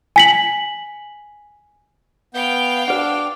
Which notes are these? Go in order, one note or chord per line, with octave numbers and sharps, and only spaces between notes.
G#5 B6 F#7
B3 F5 G5 G6
D4 B4 F#5